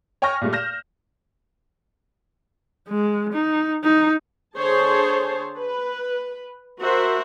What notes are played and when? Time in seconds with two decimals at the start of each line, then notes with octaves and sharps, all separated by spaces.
0.22 C#5 G5 G#5 C#6 F6 A#6
0.41 A#2 G3 A3
0.53 F6 G6 A#6 E7
2.88 G#3
3.33 D#4
3.83 D#4
4.57 D3 G#4 C5 C#5 A5
5.58 B4
6.81 F#4 A#4 C5 E5